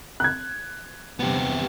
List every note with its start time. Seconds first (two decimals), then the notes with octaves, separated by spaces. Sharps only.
0.20 F#6 G#6
1.19 E2 G2 C3 B3 G4